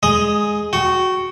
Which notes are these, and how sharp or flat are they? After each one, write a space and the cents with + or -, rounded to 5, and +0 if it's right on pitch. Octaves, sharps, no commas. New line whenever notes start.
G#3 +0 D#5 +0 D#6 +20
F#4 +0 G5 -35